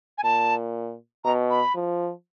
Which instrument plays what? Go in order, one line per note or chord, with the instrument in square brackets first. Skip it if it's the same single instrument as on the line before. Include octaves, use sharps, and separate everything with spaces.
[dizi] G#5
[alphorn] A#2 [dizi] A5
[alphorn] B2 [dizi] A#5
[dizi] B5
[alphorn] F3